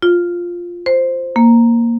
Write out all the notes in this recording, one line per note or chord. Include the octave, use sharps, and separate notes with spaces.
F4
C5
A#3